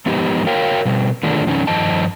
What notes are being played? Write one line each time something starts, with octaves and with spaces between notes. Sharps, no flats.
F3 G#3 B3 D#4 G4
F#4 A#4 C#5 F5 G5
B2 G3
D3 D#3 A3 D4 F4 G#4
F2 D#3 C#4 D#4
G2 D#3 F3 D#5 A5